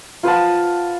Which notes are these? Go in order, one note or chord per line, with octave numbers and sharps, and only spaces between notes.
F4 B4 F#5 A5